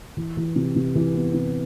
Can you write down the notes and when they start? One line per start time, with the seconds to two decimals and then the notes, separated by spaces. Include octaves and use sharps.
0.17 E3
0.37 E3
0.56 C3
0.76 C3
0.95 E3
1.15 B3
1.34 C3